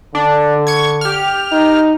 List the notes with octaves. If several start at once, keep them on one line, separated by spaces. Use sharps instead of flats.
D3 D4
C#6 G#6
G4 F6
D#4